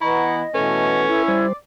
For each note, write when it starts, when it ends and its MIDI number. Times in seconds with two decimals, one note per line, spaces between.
0.01 0.42 52
0.01 0.42 59
0.01 0.46 64
0.01 1.01 75
0.01 0.36 82
0.01 0.36 85
0.54 1.05 47
0.54 1.05 52
0.54 1.05 57
0.54 1.44 61
0.54 1.23 69
0.54 1.23 71
1.08 1.47 64
1.28 1.53 55
1.28 1.53 72
1.28 1.56 74